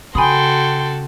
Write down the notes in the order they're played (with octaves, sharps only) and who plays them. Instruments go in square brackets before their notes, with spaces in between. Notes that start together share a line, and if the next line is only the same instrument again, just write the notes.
[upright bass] C#3 [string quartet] F#4 A4 [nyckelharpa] G5 C6 [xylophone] G#5 B5 D#6